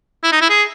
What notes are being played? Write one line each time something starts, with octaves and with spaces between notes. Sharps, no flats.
E4
D#4
E4
G#4